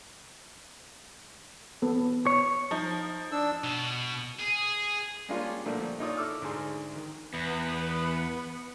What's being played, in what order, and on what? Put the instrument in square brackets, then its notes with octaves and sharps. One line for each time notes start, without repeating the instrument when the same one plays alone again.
[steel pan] B3 A4
[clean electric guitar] C#5
[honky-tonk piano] F3 D#4
[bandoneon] D4 E6
[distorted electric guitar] B2
G#4
[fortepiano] G3 G#3 A#3 C#4 D4 F4
A#2 D3 F3 G3 A3 A#3
A#3 D#4 F4 C#5 D5 D#6
E4 A4 D6 E6 F6
D2 G#2 G#4 C6
D#3
[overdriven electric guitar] E2 [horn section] B3 [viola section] B4